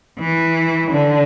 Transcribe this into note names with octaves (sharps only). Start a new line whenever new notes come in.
E3
D3